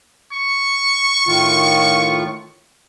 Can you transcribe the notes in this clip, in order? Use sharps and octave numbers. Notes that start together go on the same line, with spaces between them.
C#6
A2 D#3 F4